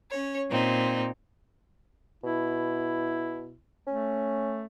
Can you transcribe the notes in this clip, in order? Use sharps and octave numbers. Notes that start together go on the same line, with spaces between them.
C#4 C#5
A#2 C4 D#4
B2 E4
A3 C#4